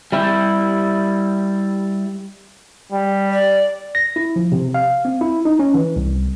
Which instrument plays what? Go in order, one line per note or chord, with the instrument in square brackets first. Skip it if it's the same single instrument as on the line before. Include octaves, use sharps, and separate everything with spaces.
[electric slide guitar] G3 E4
[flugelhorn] G3
[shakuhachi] D5
[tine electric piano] A#6
E4
F3
C3
F5
C4
E4
D#4
C#4
E3
C2